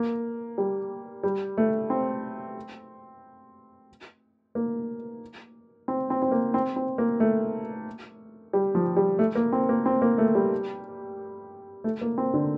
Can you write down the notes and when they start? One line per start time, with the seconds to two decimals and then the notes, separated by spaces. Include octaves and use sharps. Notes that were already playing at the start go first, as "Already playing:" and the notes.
Already playing: A#3
0.58 G3
1.23 G3
1.58 A3
1.90 C4
4.55 A#3
5.88 C4
6.10 C4
6.22 C4
6.32 A#3
6.54 C4
6.76 C4
6.98 A#3
7.20 A3
8.53 G3
8.75 F3
8.97 G3
9.19 A3
9.35 A#3
9.52 C4
9.69 A#3
9.86 C4
10.02 A#3
10.18 A3
10.35 G3
11.84 A3
12.01 A#3
12.18 C4
12.34 D3